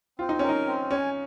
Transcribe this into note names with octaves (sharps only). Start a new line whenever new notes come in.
C4 F4
D#4
C#4 A#4
D#4
C4
C#4 G#5